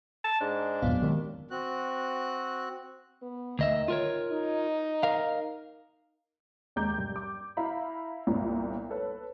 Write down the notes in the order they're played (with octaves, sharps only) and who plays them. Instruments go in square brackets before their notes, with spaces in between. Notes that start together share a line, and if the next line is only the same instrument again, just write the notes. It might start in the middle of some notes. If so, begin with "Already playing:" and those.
[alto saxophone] A5
[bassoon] G#2 [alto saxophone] D4
[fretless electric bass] G#1 E2 A#2 [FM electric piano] F#3 B3 F5
[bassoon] D#2 [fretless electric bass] D#3 G#3 C4
[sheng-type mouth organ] C4 F#4 F#6
[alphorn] B3
[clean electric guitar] D2 D#5 E5 [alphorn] D#3
[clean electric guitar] F4 A#4 C#5
[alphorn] D#4
[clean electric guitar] A#4 F5
[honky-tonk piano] D#2 G#3 A#5 D6 G6
G2
D6
E4 F5 A#5 B5
G1 C2 A#2
A4 B4 C#5